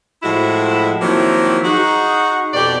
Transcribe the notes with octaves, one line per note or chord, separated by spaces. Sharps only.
A2 F3 G#3 E4 F#4
D#3 F3 F#3 A#3 C4 E4
D#4 F#4 G#4
F2 B2 G4 D5